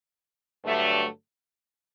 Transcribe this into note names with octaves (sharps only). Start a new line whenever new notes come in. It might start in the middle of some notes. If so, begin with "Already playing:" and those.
G2 D3 F#3 A3